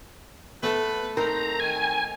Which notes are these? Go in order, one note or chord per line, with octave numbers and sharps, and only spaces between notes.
A3 B3 A4 B4
C4 D#4 A#4 A#5
D#3 G#5